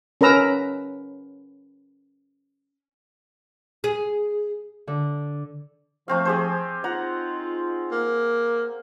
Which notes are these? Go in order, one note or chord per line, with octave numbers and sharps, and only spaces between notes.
C#4 A#4 B4 A#5 E6
G#4
D3
F3 A3 C4 F5
G4 G#4 C5
D#4 F4 F#5 A#5
A#3